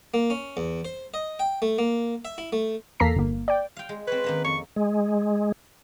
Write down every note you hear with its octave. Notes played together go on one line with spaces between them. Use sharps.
A#3
C#4
E2
C5
D#5
G5
A3
A#3
E5
E4
A3
E2 A#3 A4 A#5 B6 C7
G1 A#3
D5 G5
F5 G5
G#3
C4 B4 C#5
D#3 A#3 C#4
F2 C#6
G#3